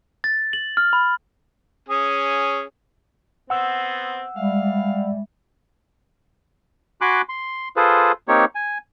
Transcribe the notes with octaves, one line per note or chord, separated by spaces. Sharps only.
A6
F#7
F6
B5
C#4 G#4
B3 C4 F#5 E6
G3 G#3 E5 F5
F#4 G#5 B5 C6 D6 F#6
C6
F4 G#4 A4 B4 C5
A#3 C4 D#4 G4 C#5
G#5